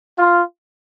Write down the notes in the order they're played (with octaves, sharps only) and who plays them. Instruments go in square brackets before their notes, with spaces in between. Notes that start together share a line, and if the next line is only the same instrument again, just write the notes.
[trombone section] F4